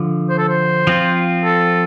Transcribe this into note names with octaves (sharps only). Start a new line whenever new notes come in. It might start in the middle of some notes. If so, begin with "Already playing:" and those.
Already playing: D3 F3
C5
A4
C5
F3 C4 F4
A4